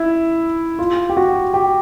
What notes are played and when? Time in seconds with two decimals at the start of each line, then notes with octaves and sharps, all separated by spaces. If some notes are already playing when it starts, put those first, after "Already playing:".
Already playing: E4
0.79 F4
1.09 G4
1.17 F#4
1.54 G4